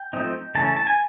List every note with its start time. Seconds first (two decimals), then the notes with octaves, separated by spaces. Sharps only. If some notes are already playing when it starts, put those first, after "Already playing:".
Already playing: G5
0.13 F3 A3 C4 D#4
0.55 C#3 E3 A3 C#4 A5
0.66 A5
0.77 A5
0.87 G#5